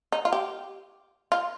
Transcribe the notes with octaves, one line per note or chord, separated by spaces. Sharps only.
D#4
F4
G4
F4